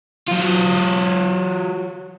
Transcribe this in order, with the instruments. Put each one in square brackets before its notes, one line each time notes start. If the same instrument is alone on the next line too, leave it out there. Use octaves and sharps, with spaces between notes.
[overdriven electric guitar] F#3 F4